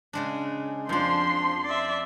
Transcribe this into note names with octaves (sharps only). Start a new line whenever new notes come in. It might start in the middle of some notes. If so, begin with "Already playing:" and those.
C#3 G#3 D4
F2 F3 D4 C6
D5 E5